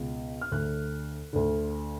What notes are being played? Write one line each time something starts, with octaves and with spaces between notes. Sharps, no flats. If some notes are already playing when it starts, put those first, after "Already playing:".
Already playing: C#2 B2
F6
D2 D3 F#6
D2 D3